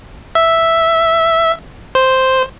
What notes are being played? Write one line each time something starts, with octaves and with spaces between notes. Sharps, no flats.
E5
C5